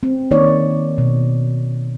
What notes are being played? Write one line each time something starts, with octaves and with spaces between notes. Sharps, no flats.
C4
D#3 A#3 D#4 C#5 D5
B2